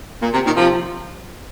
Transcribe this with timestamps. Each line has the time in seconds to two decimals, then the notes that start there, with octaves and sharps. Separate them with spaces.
0.21 A#2
0.33 C3
0.44 A#2 D#3
0.56 C3 F3